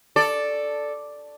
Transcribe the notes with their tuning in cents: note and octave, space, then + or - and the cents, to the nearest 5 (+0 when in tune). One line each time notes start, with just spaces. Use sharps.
A4 +0 D5 +0